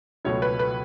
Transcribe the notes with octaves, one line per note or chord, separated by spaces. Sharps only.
C#2 B2 F#3 A3 C#5
B4
B4